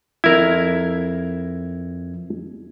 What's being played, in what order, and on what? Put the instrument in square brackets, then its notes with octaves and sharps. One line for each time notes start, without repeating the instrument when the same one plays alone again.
[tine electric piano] F2 G#6 [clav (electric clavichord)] E4 A#4